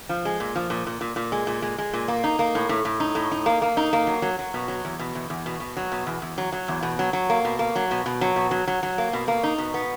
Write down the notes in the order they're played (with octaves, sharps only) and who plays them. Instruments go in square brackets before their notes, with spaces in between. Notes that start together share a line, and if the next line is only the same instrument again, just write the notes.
[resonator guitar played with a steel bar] F3
G#3
A#2
F3
A#2
A#2
A#2
A#2
G#3
A#2
G#3
G#3
A#2
A#3
D#4
A#3
A2
A2
A2
D#4
A2
D#4
A#3
A#3
D#4
A#3
F#3
F#3
F#3
B2
F#3
E2
B2
E2
E2
B2
B2
F#3
B2
E2
E2
F#3
F#3
E2
B2
F#3
F#3
A#3
B2
A#3
F#3
B2
B2
F#3
B2
F#3
F#3
F#3
A#3
B2
A#3
D#4
B2
B3